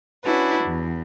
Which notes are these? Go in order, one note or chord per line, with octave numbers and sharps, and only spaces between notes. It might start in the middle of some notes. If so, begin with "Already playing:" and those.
C#4 D4 E4 F#4 B4
E2